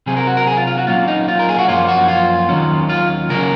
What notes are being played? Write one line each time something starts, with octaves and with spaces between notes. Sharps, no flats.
C3 F#3 C4 G#4
A#4
F#4
A#4
G#4
F4
F4
F#4
A#2 F#3 A#3 C#4 F4
D#4
F4
A#4
G#4
F#4
F#2 F3 A#3 C#4 F4
F#4
F4
D#2 D#3 F#3 C#4
F4
C#2 C#3 F#3 C#4 A#4